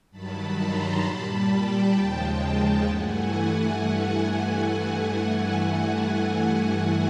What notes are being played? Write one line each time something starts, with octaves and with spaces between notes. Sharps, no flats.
G2 D#3 F#3 A5 B5
A#5 C6
A#2 G3 A5 B5
G5 A5
D#2 C#3 F3 G#3
G2 E3 A3 F#5 G#5